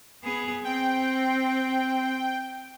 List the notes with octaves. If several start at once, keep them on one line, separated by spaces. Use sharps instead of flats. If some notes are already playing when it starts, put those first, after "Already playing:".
B3 G#4
C4 G5